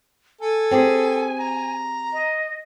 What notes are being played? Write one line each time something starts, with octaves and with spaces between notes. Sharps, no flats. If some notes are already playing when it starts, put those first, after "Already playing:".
A4 G#5
C4 G4 G#4
A#5
D#5